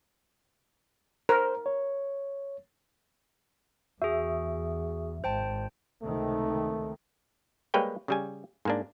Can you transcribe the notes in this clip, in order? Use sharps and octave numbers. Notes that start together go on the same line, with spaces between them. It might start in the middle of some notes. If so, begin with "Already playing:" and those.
A#4 C5
C#5
E2 F#4 G#4 E5
G#1 C5 G5 A5
C#2 C3 D#3 A3
G3 G#3 A#3 B4 C#5 G5
C#3 G3 G#5
G#2 A#3 D4